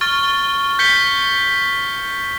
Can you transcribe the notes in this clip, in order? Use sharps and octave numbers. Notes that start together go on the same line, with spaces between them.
C#6 F6 A6 G7
G6 B6 C#7 G7